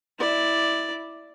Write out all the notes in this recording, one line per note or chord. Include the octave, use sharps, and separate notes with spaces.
E4 D5